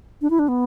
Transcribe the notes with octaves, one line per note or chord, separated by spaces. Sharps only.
D4
E4
D4
B3